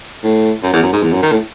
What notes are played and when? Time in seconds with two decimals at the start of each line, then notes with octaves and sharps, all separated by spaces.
0.24 A2
0.63 F#2
0.74 E2
0.83 F#2
0.93 G#2
1.03 E2
1.12 F#2
1.23 D#3
1.32 A2